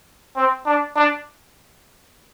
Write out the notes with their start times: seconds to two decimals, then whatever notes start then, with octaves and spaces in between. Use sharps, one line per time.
0.36 C4
0.66 D4
0.95 D4